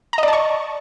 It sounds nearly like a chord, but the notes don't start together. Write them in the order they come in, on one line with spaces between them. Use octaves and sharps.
A#5 D#5 D5 A5 C#6